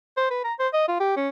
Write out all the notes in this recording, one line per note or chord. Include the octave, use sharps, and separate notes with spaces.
C5
B4
A#5
C5
D#5
F4
G4
C#4